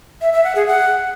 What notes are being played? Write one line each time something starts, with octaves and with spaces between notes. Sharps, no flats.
E5
E5
F#5
G#4
F#5